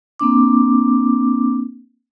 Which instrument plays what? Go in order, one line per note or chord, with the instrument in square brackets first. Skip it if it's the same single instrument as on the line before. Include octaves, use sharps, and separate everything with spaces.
[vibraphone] A#3 C4 D4 D6